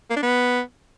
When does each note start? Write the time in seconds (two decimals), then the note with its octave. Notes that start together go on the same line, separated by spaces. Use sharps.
0.10 A#3
0.16 D4
0.23 B3